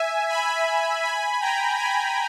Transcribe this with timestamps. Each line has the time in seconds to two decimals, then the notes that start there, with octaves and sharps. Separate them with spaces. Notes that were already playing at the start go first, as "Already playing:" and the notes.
Already playing: E5 G#5
0.29 G#5 B5
1.03 G#5 B5
1.41 G5 A#5
1.77 G#5 B5